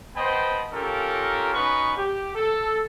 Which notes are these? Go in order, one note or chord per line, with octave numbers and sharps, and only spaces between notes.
B3 C5 D#5 G5 A5 B5
C#4 F4 G4 A4 A#4
B3 C#4 D#4 F#4 B4 C#6
G4
A4